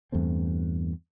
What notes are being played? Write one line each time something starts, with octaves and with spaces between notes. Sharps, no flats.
E2 G2 A3 C4